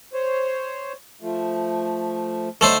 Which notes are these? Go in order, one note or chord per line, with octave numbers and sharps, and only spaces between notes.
C5 C#5
F3 A3
D3 A3 D#4 A4 C5